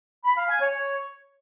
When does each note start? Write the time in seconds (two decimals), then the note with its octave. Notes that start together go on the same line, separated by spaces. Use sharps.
0.25 B5
0.37 F5
0.49 G#5
0.61 C#5